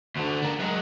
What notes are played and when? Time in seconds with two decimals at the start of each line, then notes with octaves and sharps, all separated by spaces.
0.16 D2 D3
0.42 D4 A#4
0.60 F#3 G#3